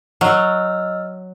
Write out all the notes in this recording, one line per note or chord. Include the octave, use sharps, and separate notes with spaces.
F#3 D#5 E6 F6